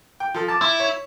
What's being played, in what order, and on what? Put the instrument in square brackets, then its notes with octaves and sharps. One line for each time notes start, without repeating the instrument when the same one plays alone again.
[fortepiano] G5
F3 A4
A5 D6
[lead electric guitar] E4
[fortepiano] C#5